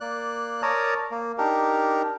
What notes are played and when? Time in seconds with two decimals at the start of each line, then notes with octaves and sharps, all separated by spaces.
0.01 A#3 D5 F#6
0.62 A#4 C#5 D5 A5 A#5 D#6
1.11 A#3
1.38 D4 D#4 G4 A#4